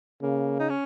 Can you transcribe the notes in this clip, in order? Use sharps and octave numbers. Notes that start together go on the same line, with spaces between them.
C#3 A#3
D#4
C#4